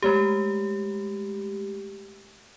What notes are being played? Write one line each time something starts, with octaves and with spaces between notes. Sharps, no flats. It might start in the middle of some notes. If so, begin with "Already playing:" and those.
G#3 A3 G4